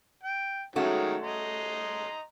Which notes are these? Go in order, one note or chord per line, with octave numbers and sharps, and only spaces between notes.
G5
D#3 F#3 G#3 A3 C#4 F#4
D#5 A#5 C6